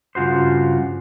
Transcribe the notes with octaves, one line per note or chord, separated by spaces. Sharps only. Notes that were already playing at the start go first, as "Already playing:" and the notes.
G2 C#3 F4 F#4 C5